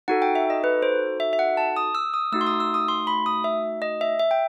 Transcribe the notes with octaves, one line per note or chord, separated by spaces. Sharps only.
D#4 F#4 A4 F#5
G5
E5
D#5
B4
C5
E5
E5
F#5
A5
D#6
E6
D#6
A3 D#4 F#4 E6
C6
D#6
E6
D#6
C6
B5
D#6
E5
D#5
E5
E5
G5